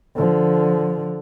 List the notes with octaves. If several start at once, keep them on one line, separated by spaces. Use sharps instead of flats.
D3 F3